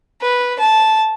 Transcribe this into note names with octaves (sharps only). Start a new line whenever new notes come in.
B4
A5